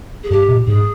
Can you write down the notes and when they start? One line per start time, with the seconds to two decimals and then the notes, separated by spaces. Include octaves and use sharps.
0.23 G#4
0.30 G2 G4
0.48 A#2
0.67 G#2 G#4